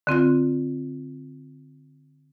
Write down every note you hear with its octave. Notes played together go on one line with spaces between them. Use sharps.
D3 C4 F4 F#6